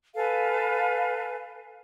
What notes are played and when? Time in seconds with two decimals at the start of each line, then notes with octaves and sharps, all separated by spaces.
0.14 A4 B4 F5 G#5